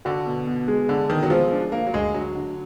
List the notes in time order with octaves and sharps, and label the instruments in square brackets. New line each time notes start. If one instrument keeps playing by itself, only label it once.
[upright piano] D3 [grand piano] F#4
[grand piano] B2
B2
G#3
[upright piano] D3 [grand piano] D4
[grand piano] B2 [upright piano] D#3
[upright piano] F#3
[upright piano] F3 [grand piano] G#3
[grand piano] D4
[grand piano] D3 [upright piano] A#3
[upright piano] F#3
[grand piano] D2 [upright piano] G#3
[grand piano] D3 [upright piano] F#3
[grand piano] D3